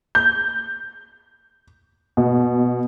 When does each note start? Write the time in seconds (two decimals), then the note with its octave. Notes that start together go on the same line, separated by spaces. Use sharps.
0.15 G6
2.17 B2